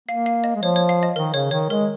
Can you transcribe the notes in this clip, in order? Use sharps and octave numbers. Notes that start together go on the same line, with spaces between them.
A#3 F5
F5
D#5
G#3
F3 C#5
C#5
F5
D#5
D#3 A#4
C#3 C#5
D#3 C#5
G#3 A#4